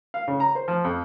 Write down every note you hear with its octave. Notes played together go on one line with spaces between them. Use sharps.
F5
C#3
A#5
C5
F3
F2